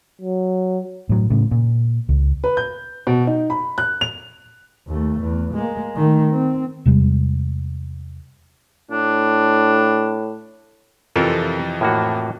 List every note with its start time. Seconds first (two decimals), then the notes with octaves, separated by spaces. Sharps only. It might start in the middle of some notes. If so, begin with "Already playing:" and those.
0.22 F#3
1.09 A2 F#3
1.30 A2 C#3
1.51 A#2
2.09 C#2
2.44 B4
2.57 G6
3.07 B2
3.27 D#4
3.50 B5
3.78 F#6
4.01 F7
4.87 D#2 A3
5.21 E2
5.54 G#3 A#3
5.96 D#3 A3
6.30 C4
6.86 E2 C3 G3 G#3
8.91 A2 D4
11.16 F2 C3 E3 F3 F4 A4 A#4
11.81 A2 A#3 F#4